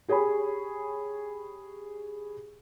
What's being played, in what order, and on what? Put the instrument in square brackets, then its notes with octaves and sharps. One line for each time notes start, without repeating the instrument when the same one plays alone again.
[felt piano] G4 G#4 C#5 G#5 B5